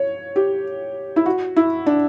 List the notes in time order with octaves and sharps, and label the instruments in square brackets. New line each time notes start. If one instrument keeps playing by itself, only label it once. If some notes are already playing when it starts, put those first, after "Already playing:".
Already playing: [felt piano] C#5
G4
E4
F#4
E4
D4